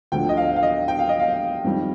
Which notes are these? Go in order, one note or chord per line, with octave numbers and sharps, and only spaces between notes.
D2 D3 F3 G5
D#5
F5
F5
D#5
G5
F5
D#5
F5
F2 D#3 G3